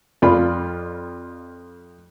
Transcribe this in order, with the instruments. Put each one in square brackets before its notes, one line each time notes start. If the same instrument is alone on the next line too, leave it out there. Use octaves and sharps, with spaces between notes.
[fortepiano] F2 F4 D5 B5